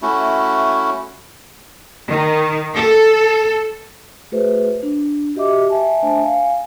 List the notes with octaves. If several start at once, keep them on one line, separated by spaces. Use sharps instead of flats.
A3 C#4 E4 F#4
D#3
A4
A3 F#4 G#4 B4 C5 E5
D4
F#4 G4 D#5 E5 D6
E5 G#5 A5
A3 D4 C5 E5 G#5 A5
F5 G#5